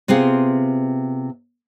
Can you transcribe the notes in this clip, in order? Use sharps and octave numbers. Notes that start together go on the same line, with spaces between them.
C3 B3 C4 F4 G#4